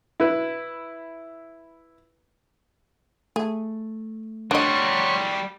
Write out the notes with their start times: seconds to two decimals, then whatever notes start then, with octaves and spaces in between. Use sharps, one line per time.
0.20 E4 B4
3.36 A3 G#4
4.51 G3 D4 F#4 C#5 D#5 C6 C#6